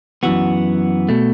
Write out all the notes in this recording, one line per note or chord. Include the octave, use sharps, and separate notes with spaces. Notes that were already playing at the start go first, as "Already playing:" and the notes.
F#2 E3 B3 F#4
B2 A3